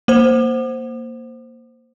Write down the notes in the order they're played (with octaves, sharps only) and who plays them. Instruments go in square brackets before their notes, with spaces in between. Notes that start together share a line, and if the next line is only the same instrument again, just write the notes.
[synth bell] A#3 C5